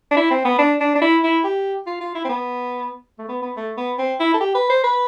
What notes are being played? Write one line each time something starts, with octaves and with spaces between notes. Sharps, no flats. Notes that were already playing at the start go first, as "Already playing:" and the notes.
D4
E4
C4
B3
D4
D4
D4
E4
E4
G4
F4
F4
E4
C4
B3
A3
B3
B3
A3
B3
C4
E4
A4
G4
B4
C5
B4